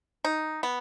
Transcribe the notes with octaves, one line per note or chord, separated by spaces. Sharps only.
D#4
B3